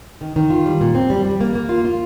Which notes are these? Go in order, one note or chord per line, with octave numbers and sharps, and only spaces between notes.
D#3
D#3
F4
G3
A#2
C4
G3
G3
A#3
A#3
F4
F4